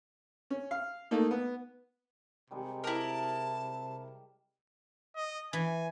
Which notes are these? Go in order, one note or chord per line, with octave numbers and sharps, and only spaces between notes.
C#4
F5
A3 A#3 D#4
B3
C3 D#3 G3 G#3
E4 A#4 D#5 G5 A5 D6
D#5
E3 G#5